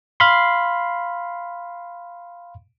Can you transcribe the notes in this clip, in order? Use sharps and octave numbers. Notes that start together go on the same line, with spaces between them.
F5 B5 C6